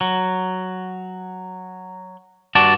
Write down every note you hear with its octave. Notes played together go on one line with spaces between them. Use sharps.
F#3
G2 F#4 D5 A5